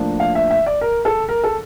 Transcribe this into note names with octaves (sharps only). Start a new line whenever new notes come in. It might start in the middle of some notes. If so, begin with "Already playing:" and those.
Already playing: A2 F3 A#3 D4
F5
E5
E5
D5
A#4
A4
A#4
A4